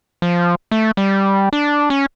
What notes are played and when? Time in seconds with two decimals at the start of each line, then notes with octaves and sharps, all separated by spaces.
0.22 F3
0.71 A3
0.97 G3
1.53 D4
1.90 C#4